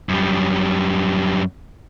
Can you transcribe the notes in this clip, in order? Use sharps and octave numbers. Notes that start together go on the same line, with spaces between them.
F#2 G3